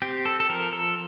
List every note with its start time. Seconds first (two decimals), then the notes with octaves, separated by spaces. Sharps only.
0.02 C4 G4
0.25 A4
0.40 A4
0.50 F3 A#4
0.73 A4